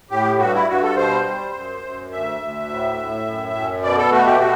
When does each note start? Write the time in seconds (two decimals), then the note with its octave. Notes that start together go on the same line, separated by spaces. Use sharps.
0.11 A2 G4
0.39 G2 F#4
0.54 E4
0.68 G2 F#4
0.83 A4
0.97 B2 C5
1.25 G3
1.53 F#2
1.82 F#2
2.11 D2 E5
2.40 D2
2.69 A2
2.97 A2
3.26 F#2
3.55 F#2
3.83 B2 D5
3.98 A4
4.12 A3 F#4
4.26 G4
4.39 B2 F#4